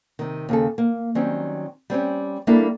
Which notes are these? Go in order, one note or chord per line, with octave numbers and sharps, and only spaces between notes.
C3 D#3
D#2 C#3 A4
A#3
D#3 F#3 G3 C4 C#4
G3 C4 C#4 G4
G3 A#3 D4 E4 A4